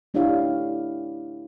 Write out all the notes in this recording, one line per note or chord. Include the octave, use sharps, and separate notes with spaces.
A3 D4 E4 G4 C#5 F5